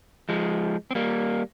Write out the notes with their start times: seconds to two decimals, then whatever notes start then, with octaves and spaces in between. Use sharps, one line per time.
0.29 F3 G#3
0.91 C4
0.95 G3 A#3